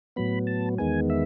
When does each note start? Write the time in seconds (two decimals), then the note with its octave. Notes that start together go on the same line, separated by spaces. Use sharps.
0.16 A2 F#3 B3 B5
0.47 A5
0.78 E2 D#3 G#3 B3 G#5
1.10 E5